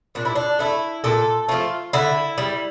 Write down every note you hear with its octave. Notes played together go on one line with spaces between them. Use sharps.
A#2 D4
E4
D4
A3 E4
A#2 A4
F3 A3 F4
D3 E4
G3